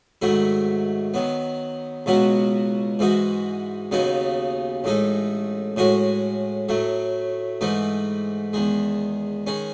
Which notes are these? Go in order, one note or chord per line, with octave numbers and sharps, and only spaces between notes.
G#2 D#3 F#3 A3 E4
D#3 F#3 B3
C#2 B2 F#3 B3 F#4
G#2 E3 G#3 D#4 F#4
D#2 C#3 F#3 B3 D#4
A1 A2 G#3 D#4 A4
A2 G#3 C#4 F#4
A2 F#3 A3
G#2 E3 A3 D#4
E2 D#3 G#3
D#3 G#3 C#4